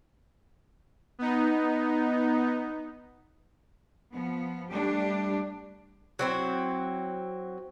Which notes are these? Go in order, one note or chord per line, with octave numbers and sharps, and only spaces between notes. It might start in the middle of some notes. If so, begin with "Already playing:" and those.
B3 D#4
F3 B3
G3 A3 D4 G4
F#3 C4 E4